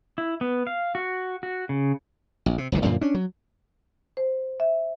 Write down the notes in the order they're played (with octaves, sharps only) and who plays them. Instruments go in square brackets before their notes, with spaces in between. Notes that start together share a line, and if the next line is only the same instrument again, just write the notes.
[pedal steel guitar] E4
B3
F5
F#4
F#4
C#3
[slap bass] A#1
C3
F#1 C#2 C3 D#3
F#2 A#2 D3 F3
C#4 D4
F#3
[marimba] C5
E5